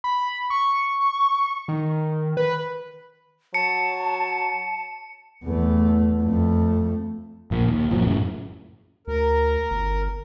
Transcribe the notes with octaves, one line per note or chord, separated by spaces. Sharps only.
B5
C#6
D#3
B4
F#3 A5 C#7
E2 A3
F2 A3
A#1 A#2
D#2
G1 A#2 F3 F#3
F#2 A2 C#3
D2 A#4
G1